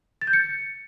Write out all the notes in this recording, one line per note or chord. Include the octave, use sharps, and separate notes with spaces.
A6
G6
C#7